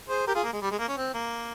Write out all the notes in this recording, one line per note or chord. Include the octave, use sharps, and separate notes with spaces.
G#4 C5
G4 A#4
F4 G#4
A#3
G#3
G3
G#3
A#3
C#4
C4
A#3